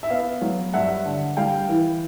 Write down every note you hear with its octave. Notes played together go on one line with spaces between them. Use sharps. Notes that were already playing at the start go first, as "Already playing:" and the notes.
E5
B3 F5
F#3
G2 E5 F#5
D3
G3 F5 G5
E3